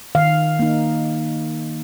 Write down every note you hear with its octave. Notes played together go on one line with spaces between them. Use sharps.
D#3 F5
A#3 D#4